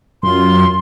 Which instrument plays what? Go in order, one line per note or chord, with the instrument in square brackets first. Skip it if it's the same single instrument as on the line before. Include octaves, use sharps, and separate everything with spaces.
[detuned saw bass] F#2 [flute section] F4 C6